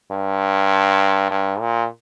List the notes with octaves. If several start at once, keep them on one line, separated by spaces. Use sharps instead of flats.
G2
G2
A#2